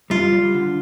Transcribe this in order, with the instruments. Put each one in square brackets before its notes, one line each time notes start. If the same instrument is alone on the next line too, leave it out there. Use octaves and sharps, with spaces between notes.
[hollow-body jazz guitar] G3 [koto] F4
[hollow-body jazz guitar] G3
D3